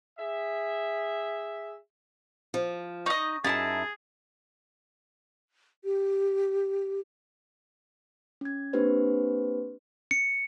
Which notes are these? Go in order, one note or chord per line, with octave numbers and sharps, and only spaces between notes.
G#4 E5
F3
D#4 D#5 C#6
F#2 D#4 E4 G#4 A5 A6
G4
C#4 G#6
A#3 C4 D4 G4 B4 C5
C#7